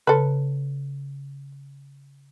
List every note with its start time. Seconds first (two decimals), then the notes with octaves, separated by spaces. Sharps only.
0.07 C#3 A4 B4